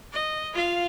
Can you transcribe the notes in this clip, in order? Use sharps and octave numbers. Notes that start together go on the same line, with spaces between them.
D#5
F4 F5